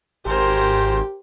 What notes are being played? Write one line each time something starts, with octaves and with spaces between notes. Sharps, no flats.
G#1 G4 A#4 C5 G#5 C6 G6